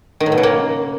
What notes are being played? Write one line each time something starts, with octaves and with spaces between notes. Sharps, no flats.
D#3
A2
B2
C#3
A#3